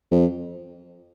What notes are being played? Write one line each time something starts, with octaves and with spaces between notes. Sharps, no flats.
F2